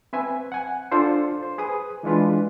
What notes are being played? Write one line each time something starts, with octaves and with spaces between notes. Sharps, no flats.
C4 B4 E5 G#5
F#5 G#5
D4 F4 A4 C5
C5
G#4 B4 D#6
E3 G#3 D4 F4 B4